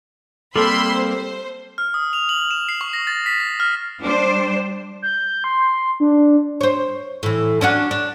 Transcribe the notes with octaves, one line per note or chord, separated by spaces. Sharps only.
G3 A#3 C4 A4 B5 C6 E6
C5
F6
D#6
F7
F#7
E7
C7
C#6
A#6
A6
B6
A#6
F6
G3 D4 C5
G6
C6
D4
C5 C#5
A2 E3
C#4 D4 F#4
D4